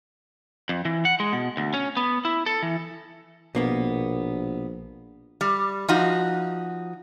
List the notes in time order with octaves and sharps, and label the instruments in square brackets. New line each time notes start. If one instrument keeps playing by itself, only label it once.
[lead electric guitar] F2
E3
F#5
G#3
B2
D2
C#4
B3
E4
A4
E3
[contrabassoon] A#1 [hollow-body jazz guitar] B2 A#3 B3
[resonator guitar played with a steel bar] G3
F3 D#4 F#4